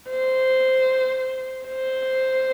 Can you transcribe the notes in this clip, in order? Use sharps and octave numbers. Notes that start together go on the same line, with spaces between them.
C5
C5